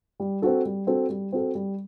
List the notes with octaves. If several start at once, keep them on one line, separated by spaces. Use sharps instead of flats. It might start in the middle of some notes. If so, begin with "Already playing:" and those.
G3
C4 F#4 A4
G3
C4 F#4 A4
G3
C4 F#4 A4
G3